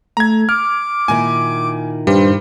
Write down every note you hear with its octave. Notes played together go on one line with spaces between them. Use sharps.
A3 A#5 G#6
D6 F6
A#2 D#3 E4 G#5
G2 G3 C5